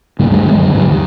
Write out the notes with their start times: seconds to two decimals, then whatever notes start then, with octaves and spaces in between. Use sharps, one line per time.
0.19 G#2 C#3 G3 A#3
0.31 D2 G2 F#3 G#3
0.46 D#3 G3 G#3 B3
0.58 F#2 D3 F#3 G#3
0.75 G#2 D3 D#3 F#3
0.88 D#2 D#3